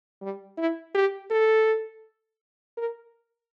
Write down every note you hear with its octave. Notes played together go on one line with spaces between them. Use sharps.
G3
E4
G4
A4
A#4